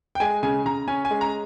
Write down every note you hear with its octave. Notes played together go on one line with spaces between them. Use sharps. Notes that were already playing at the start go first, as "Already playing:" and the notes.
G5
G#3 G#5
C#3 G#5
C#3 A#5
C#4 G#5
G#5
G#3
A#5